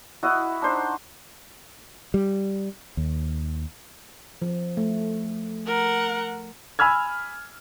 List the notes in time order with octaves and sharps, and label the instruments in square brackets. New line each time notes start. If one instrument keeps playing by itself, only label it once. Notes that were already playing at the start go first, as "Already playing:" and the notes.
[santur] E4 F#4 D#5
D4 D#4 C5
[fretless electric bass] G3
D#2
[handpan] F3
A3
[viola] A#4 F#5
[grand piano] G#5 B5 E6 F6 G#6